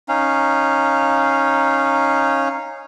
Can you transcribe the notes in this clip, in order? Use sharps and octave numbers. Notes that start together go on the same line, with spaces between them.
C#4 D#4 F5